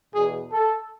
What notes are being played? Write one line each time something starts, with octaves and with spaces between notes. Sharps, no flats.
E2 B2 G#4
A4